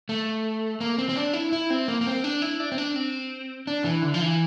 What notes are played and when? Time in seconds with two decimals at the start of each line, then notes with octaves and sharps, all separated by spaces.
0.09 A3
0.81 A#3
0.98 C4
1.09 C4
1.16 D4
1.33 E4
1.52 E4
1.70 C4
1.88 A#3
2.01 A#3
2.06 C4
2.24 D4
2.42 E4
2.60 D4
2.72 C4
2.78 D4
2.96 C4
3.67 D4
3.84 E3
4.02 D3
4.14 F3
4.21 E3